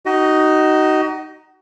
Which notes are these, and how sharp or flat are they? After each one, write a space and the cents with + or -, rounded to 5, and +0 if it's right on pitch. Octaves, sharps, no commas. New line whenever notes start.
D#4 +0 F#4 +35 D#5 +0